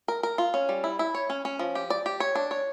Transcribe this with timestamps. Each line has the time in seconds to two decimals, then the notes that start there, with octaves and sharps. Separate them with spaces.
0.08 A#4
0.23 A#4
0.38 F4
0.54 C#4
0.69 G3
0.84 E4
0.99 E4
1.15 C#5
1.30 C#4
1.45 C#4
1.59 F3
1.75 G4
1.90 D5
2.06 G4
2.20 C#5
2.35 D4
2.51 C#5